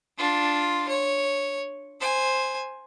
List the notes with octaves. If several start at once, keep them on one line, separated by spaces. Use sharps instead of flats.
D4 F4
C#5
C5 G#5